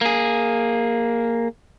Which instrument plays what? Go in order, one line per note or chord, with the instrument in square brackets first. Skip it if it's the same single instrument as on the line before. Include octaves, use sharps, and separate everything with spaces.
[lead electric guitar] A#3 G#4